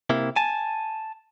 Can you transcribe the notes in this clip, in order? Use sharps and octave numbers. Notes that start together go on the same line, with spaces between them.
C3 A#3 E4
G#5 A5